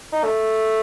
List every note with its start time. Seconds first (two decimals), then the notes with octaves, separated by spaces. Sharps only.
0.12 D#4
0.24 A3